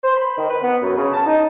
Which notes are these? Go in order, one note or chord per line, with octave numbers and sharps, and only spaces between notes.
C5
B5
D#3
B4
B3
F#2
C#3
A5
D#4